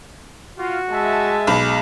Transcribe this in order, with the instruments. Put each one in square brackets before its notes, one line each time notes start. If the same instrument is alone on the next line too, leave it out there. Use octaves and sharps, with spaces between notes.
[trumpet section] F4 [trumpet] F#4
[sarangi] G#3 [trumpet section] E5 A5
[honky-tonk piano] B1 B5